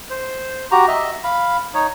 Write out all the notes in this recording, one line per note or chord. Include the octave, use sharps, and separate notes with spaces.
C5
F#4 G4 A#5
D#5 E5
F5 B5
D#4 C#5